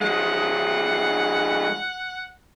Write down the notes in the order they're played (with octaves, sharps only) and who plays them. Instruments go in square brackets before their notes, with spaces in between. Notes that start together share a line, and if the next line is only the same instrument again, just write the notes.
[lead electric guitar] F3 G#3 [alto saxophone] F#5